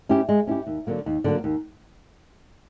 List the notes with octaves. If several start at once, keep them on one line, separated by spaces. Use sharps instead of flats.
C#4 E4 G4
G#3
C#4 E4 G4
D#2
D3 F#3 A#3
D#2
D3 F#3 A#3
D#2